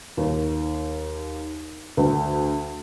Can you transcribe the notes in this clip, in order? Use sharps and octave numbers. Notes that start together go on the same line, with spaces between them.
D#2
D2